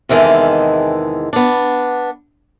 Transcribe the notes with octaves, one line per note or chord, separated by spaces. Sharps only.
E2 C3 D#3 E3 G#3 A4
B3 D4